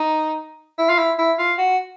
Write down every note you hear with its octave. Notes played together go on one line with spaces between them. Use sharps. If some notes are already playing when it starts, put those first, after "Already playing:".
Already playing: D#4
E4
F4
E4
E4
F4
F#4